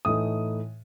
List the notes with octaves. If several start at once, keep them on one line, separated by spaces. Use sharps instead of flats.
A2 E3 A3 D#4 D#6